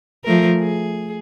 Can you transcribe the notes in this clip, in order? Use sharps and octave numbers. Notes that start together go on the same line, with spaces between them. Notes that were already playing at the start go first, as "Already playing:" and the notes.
F3 A3 A#4
G#4